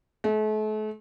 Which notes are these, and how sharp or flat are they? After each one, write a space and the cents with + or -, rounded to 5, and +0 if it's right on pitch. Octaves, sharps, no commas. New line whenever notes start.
A3 -40